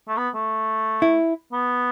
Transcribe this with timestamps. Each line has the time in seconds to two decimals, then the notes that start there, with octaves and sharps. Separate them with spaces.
0.08 A3
0.17 B3
0.35 A3
1.02 E4
1.53 B3